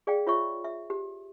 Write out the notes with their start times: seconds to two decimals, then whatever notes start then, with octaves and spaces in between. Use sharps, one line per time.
0.07 G#4 D5 F5 G5
0.27 F4 C#5 E5 C#6
0.64 E5
0.90 G4